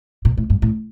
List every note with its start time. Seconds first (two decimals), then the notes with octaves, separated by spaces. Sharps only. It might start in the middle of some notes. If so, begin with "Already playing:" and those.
0.25 A#2
0.37 A2
0.50 G2
0.62 A2